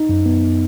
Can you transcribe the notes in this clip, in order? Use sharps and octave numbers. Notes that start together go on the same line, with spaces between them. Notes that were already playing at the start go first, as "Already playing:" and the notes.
Already playing: D#4
F#2
B3